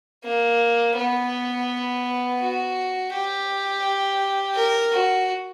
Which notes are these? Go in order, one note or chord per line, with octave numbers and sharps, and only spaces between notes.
A#3
B3
F#4
G4
A#4
F#4